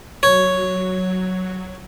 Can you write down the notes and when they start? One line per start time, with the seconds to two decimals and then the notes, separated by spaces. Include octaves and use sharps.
0.23 F#3 C#5